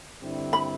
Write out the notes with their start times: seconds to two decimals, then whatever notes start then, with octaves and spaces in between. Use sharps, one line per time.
0.20 G2 D3 G3 C4 E4
0.53 B5